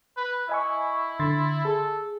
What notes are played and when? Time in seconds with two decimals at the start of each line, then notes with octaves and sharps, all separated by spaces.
0.17 B4
0.49 E4 D#5 G#5 C#6
1.20 D3 C6 A6
1.65 G#4 A4